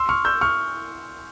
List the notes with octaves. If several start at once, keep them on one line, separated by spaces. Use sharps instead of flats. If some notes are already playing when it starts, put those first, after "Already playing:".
Already playing: C6 E6
C#6 F6
E6 G6
C#6 F6